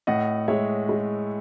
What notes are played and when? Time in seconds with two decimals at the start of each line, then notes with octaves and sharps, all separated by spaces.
0.07 A2 D#5 F#5
0.48 G#3 C#5 E5
0.89 G#3